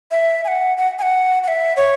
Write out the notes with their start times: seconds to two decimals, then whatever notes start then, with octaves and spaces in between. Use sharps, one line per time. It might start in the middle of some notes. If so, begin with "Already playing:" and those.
0.11 E5
0.44 G#5
0.48 F#5
0.77 F#5
0.99 G#5
1.02 F#5
1.44 F#5
1.48 E5
1.77 C#5